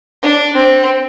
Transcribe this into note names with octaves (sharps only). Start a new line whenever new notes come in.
D4
C4